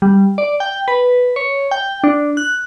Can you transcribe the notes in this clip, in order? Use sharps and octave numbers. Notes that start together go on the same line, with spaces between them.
G3
D5
G5
B4
C#5
G5
D4
F#6